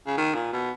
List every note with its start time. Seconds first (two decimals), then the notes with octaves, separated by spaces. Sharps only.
0.07 C#3
0.17 D#3
0.34 A#2
0.53 B2